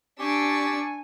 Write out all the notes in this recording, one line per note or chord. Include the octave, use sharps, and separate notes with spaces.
D4 G4 G#5 C#6 E6